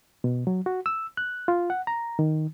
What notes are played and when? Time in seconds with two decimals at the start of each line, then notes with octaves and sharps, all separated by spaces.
0.24 B2
0.47 F#3
0.66 F#4
0.86 E6
1.17 F#6
1.48 F4
1.70 F#5
1.87 A#5
2.19 D#3